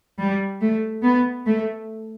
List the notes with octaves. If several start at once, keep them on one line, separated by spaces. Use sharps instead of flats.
G3
A3
B3
A3